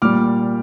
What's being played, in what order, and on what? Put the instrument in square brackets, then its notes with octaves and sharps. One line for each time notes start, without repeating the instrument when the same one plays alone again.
[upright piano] A#2 G3 D6 F6